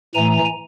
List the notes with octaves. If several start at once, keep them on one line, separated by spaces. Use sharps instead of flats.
A2 E3 A3 G#5 A#5